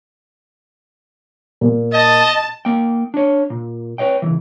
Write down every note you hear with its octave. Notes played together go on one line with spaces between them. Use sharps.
A#2
D#5 A5
A#3 G5
D4 C#5
A#2
B4 C#5 D#5 G5
C#2 C#3 E3